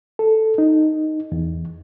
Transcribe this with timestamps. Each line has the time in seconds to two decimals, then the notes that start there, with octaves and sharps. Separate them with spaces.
0.19 A4
0.58 D#4
1.32 E2